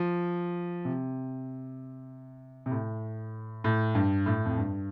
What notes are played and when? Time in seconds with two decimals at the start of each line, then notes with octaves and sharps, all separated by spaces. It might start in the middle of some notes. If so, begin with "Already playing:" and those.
Already playing: F3
0.85 C3
2.66 C3
2.71 A2
3.64 A2
3.95 G2
4.26 A2
4.45 F2
4.58 G2